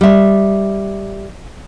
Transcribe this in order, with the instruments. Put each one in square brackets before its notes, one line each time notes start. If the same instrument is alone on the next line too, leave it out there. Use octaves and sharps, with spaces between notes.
[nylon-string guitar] G3 E5